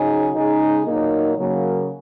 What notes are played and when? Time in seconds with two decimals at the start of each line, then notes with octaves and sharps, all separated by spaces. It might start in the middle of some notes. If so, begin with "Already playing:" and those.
Already playing: C#3 F#3 D#4 G#4
0.35 C#3 G#3 D#4 G#4
0.86 A#2 F#3 A#3 D#4
1.38 C#3 F#3 A#3